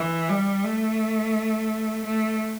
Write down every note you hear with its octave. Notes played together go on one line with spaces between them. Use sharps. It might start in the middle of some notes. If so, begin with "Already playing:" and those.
Already playing: E3
G3
A3
A3